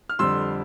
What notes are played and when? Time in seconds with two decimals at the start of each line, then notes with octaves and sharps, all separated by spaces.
0.09 F6
0.19 F2 D3 G3 C6 E6